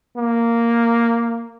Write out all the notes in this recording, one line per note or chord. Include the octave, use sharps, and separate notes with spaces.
A#3